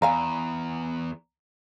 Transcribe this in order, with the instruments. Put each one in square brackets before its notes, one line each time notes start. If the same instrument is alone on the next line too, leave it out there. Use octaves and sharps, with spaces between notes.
[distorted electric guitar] E2 [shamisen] D5 F5 G#5 [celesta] A#5